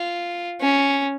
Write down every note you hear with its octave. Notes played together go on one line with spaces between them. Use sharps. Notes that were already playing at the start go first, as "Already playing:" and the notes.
Already playing: F4
C#4